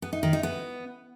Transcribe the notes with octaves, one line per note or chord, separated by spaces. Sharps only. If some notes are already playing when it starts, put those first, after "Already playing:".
B3
D#4
D#3
D#4
B3